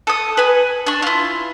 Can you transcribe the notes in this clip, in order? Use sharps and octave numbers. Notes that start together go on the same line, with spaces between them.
A4 D#6
B4 G#5
D4 C#6
E4 F4